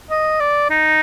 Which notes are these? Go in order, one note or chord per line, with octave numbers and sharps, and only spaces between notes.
D#5
D5
D#4